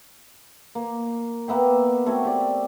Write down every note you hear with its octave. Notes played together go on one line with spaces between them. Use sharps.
A#3
A#3 B3 E5 G5
A3 C4 F#4 C#5
G4 D5